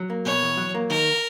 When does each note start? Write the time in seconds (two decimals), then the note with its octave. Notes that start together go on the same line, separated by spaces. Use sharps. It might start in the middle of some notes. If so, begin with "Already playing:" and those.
Already playing: F#3
0.10 A#3
0.25 B2 C#5
0.42 E2
0.57 F#3
0.74 A#3
0.90 D#3 A#4